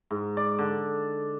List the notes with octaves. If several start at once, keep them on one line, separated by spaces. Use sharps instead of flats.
G#2
D5
D3